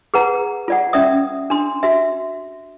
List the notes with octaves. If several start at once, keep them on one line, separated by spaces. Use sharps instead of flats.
G#4 B4 F#5 A#5
F4 D5 F#5
C#4 D5 E5 D#6
D4 C6
F#4 E5